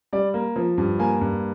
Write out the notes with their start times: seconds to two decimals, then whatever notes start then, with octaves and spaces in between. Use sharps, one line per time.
0.13 G3 D5
0.34 A#3
0.56 F3
0.78 G2
0.99 A#3 G#5
1.21 G2